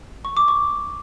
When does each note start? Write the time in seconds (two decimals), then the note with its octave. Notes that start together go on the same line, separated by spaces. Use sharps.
0.25 C#6
0.37 D6
0.48 C#6